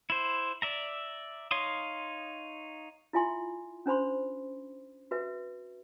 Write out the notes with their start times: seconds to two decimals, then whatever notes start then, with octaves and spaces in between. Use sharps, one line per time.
0.10 E4 C5
0.62 D5 E5 A#5
1.51 D#4 C#5 F5 C6 D#6
3.13 E4 F4 E5 G#5 C6
3.86 C#4 D4 C5 B5 C6
5.11 F#4 B4 E5